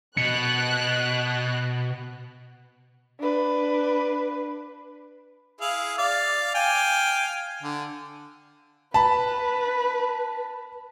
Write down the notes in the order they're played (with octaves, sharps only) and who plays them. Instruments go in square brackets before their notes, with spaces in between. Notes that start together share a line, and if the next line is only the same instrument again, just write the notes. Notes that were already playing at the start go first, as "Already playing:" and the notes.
[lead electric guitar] B2 [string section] F#6 [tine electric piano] C#7
[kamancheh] D4 B4
[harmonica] E4 G#4 F5
D5 F5
F5 G5 G#5
D3
[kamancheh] B4 [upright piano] A5 B5